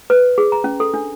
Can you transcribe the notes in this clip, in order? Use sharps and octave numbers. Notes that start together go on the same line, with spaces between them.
B4
G#4
A#5
C#4
A4
D4